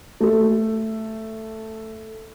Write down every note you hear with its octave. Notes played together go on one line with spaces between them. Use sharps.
A3 A4